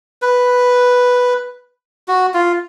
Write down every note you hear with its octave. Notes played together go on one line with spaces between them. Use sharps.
B4
F#4
F4